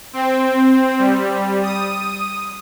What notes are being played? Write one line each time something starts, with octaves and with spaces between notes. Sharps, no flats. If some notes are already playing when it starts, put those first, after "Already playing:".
C4
G3
D#6